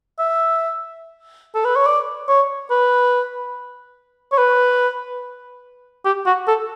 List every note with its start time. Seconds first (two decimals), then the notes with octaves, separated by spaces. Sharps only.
0.19 E5
1.55 A4
1.65 B4
1.76 C#5
1.86 D5
2.28 C#5
2.70 B4
4.32 C#5
4.38 B4
6.05 G4
6.26 F#4
6.47 A4